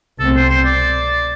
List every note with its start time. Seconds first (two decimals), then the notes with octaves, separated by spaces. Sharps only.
0.20 C2 B2 A3 C4 A4
0.35 C5
0.50 C5
0.65 D5